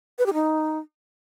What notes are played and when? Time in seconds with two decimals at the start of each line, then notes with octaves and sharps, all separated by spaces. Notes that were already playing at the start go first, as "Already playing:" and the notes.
0.19 B4
0.26 G4
0.34 D#4